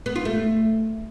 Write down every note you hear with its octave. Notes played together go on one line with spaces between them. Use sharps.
B3
F4
A3